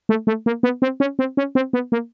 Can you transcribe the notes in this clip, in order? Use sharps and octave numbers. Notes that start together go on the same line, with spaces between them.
A3
A3
A#3
B3
C4
C#4
C4
C#4
C4
B3
A#3